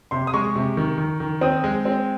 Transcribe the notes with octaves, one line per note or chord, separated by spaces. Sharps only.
C3 C6
D#6
G#3 C#6
C3
D#3
D#3
D#3
C4 D#6
G#3
C4